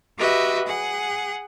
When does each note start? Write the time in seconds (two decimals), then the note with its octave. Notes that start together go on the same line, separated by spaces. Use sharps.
0.17 F#4 G4 B4 D#5 E5
0.66 G#4 F#5